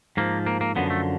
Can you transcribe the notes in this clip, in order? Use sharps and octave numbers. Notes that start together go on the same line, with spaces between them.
G#2 F3 A#3
A#3
A#3
F#2 D3 F3 B3
A3